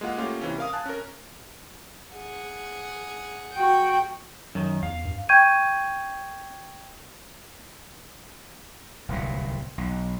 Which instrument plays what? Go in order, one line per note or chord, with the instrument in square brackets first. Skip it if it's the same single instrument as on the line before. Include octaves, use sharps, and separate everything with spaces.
[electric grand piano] G#3 A#3 F4 F#5
A3 A#3 C#4 F4 G4
C3 E3 C#4
A#4 F5 D#6
G#5 A5 F#6
C#4 A#4
[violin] G#4 F#5
[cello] F#4 G5
[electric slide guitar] F#2 D#3
[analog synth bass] E2 [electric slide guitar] F5
[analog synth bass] G2
[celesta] G5 C#6 G6 G#6 D#7
[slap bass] D1 C2 A#2
B1